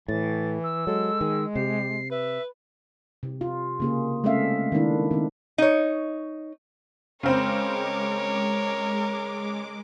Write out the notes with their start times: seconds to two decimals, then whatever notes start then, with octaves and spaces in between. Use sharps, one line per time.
0.08 A2 E3 A6
0.64 E6
0.87 F#3 G#3 A4
1.21 D#3 G#4
1.55 C3 G4 C7
2.11 B4 E5
3.23 C3
3.41 F4
3.80 C#3 A#3 G#4
4.24 G#3 A3 C4 C#4 E5 F5
4.72 D#3 G#3 A#3 D4 E4
5.11 D#3 C4
5.58 D#4 C#5
7.23 C#3 G#3 C4 A#4 C5 C#5 D6